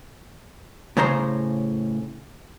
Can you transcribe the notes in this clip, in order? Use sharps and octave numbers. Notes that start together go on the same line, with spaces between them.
A2 C#3 C5 A#5 C6